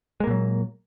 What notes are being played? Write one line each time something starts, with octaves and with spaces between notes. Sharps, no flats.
A#2 F#3 G#3 A#3